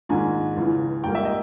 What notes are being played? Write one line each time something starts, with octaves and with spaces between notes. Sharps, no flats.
A#1 G#2 D#3 G#3 G#5
C#2 C#3 E3
A#1 G#2 G3 A#3 G5
E5
D#5